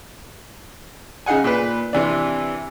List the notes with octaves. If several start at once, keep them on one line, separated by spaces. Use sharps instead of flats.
C#3 D#4 G#4 F#5 G#5
A#2 B4
C3 E3 D4